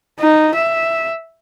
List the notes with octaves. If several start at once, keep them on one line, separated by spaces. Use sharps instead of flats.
D#4
E5